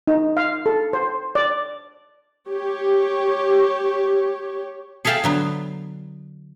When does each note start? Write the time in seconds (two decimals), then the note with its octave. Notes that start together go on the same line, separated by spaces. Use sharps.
0.07 D#4
0.37 F5
0.66 A4
0.93 C5
1.35 D5
2.49 G4 C#5
5.05 G#4 A4 E5 F5 G5 A5
5.24 D3 F#3 B3